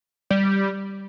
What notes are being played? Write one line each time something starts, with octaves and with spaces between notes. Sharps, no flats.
G3